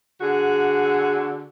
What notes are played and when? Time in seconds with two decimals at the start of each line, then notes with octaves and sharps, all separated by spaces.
0.21 D3 F#4 G#4